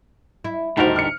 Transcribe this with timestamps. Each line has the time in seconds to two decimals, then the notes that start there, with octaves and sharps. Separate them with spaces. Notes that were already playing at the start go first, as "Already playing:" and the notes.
0.44 E4
0.77 D2 A2 D#3 G3 D#4 F#4 A#4 C5
0.96 F6 C#7